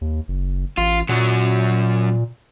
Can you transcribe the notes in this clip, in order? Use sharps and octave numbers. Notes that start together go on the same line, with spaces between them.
D#2
F#1
A1 F4
F#2 A#2 F#3